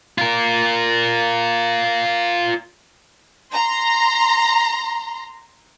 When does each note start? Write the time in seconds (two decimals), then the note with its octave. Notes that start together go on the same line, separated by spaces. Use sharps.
0.18 F4 A#4
3.53 A#5 C6